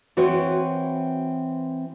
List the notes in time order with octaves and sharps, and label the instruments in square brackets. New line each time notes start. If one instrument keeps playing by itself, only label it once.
[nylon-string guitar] E3 C4 F#4 B4 C#5